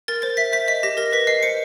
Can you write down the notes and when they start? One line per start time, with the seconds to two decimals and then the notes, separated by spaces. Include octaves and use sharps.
0.08 A#4 A6
0.22 C5 A6
0.37 E5 B6
0.53 C5 B6
0.68 D#5 B6
0.83 G4 A#6
0.97 A#4 A#6
1.12 B4 B6
1.27 D#5 C7
1.43 C5 C#7